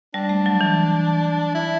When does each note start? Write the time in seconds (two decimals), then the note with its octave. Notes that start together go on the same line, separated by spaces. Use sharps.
0.14 G3 D4
0.29 A3
0.46 F#3
0.61 E3
1.55 E4